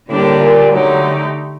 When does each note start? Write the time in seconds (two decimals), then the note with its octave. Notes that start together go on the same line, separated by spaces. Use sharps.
0.09 A2 D3 G3 A#3 D4 G4
0.40 A#2
0.72 D3 F#3 A3 D#4 G4